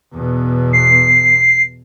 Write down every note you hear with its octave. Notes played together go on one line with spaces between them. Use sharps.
E2 B2
C7